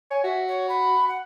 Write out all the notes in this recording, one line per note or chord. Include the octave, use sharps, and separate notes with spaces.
C#5 G#5
F#4 E5
C#5
B5
F#5